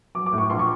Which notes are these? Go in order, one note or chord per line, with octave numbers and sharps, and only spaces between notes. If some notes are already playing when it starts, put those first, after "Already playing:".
F#3 D6
D6
A2
C#6
A#1 C6
C#6